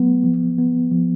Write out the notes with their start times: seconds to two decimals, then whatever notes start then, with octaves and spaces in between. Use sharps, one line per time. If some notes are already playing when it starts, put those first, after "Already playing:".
Already playing: F#3 A3 B3
0.24 F3
0.58 B3
0.92 F3